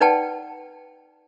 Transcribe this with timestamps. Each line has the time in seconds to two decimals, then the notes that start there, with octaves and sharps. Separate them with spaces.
0.01 D#4 B4 D5 F#5 G5 A5